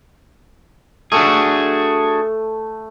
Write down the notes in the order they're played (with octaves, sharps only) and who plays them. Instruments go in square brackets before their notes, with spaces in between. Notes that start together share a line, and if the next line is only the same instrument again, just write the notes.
[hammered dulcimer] A3 [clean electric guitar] D4 F#4 G#4